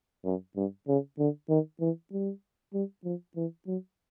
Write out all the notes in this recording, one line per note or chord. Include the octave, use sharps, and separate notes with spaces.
F#2
G2
C#3
D3
D#3
E3
G3
G3
F3
E3
F#3